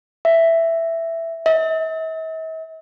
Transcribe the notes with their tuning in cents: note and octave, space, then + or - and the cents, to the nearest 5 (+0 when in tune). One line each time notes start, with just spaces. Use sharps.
E5 +5
E5 -45